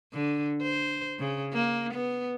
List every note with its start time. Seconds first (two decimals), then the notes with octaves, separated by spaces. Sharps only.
0.13 D3
0.62 C5
1.19 C#3
1.53 A#3
1.94 B3